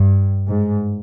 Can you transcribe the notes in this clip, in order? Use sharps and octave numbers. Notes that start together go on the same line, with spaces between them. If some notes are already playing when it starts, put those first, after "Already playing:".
Already playing: G2
G#2